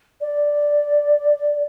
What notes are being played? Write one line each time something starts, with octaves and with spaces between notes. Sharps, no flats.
D5